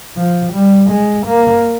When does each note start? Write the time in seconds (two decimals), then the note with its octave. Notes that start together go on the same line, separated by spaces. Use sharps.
0.17 F3
0.53 G3
0.91 G#3
1.27 A#3